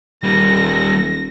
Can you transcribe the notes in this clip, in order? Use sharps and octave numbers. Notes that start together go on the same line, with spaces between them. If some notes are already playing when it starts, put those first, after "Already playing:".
D#1 G3 A#3 A#6